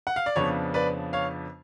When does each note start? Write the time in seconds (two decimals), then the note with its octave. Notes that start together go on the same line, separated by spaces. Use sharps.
0.07 F#5
0.16 F5
0.26 D5
0.36 F2 C#3 F3 B3 D4 C#5
0.74 B4 D5
1.13 C#5 F5